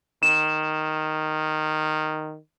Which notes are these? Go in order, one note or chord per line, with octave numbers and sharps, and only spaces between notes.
D#3 E7